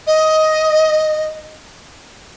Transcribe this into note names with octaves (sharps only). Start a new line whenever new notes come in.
D#5